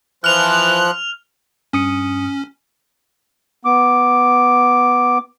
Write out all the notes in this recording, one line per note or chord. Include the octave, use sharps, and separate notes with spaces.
E3 F3 F6 F#6 F7
G2 C#4 D#6 C#7
B3 D6